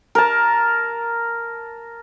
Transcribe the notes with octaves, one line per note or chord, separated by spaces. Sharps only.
A#4 A5